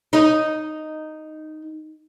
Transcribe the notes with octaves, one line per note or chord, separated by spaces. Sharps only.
D#4 D#5